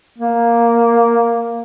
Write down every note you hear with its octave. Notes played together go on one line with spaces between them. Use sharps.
A#3